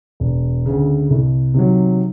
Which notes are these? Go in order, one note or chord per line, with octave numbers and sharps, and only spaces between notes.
E1
D2 C#3
C2
C3 D#3 F#3